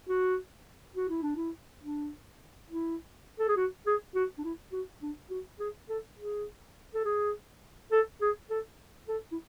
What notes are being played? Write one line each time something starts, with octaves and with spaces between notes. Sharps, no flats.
F#4
F#4
E4
D4
E4
D4
E4
A4
G#4
F#4
G#4
F#4
D4
E4
F#4
D4
F#4
G#4
A4
G#4
A4
G#4
A4
G#4
A4
A4
E4